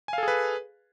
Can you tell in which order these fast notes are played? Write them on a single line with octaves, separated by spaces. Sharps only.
G#5 F5 A4 G#4 B4